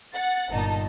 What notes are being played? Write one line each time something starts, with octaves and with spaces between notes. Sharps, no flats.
F#5 A6
G1 A#2 D#4 A5